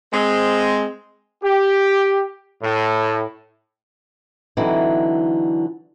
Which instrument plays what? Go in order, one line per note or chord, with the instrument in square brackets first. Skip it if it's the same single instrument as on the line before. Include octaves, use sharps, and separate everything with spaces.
[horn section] G#3 C4
[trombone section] G4
A2
[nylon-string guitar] D3 E3 F#3 C4 D#4 E4